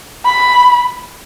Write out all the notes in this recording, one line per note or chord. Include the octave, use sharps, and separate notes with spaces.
B5